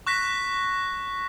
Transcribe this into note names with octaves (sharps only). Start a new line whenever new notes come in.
C#6 F#6 A#6 B6